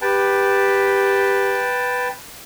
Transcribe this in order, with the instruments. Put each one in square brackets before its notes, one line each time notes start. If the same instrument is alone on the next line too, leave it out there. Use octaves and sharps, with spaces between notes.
[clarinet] G4 [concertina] B4 G5 A5